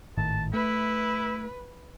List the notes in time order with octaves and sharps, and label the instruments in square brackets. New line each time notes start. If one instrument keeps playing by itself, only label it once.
[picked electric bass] G#1 A2 D#3 [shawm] A5
[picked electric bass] A3 [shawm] E4 [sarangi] B4